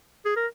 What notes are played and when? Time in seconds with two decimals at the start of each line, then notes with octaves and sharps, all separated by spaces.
0.25 G#4
0.36 A#4